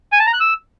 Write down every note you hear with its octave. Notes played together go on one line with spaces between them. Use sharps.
G#5
A5
A#5
F#6
E6